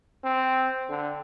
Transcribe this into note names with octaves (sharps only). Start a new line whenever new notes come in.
C4
D3